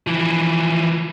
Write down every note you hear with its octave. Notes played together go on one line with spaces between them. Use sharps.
E3 F3